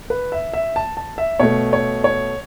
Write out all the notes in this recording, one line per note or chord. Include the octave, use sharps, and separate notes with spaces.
B4
E5
E5
A5
A5
E5
B2 A3 C#5
C#5
C#5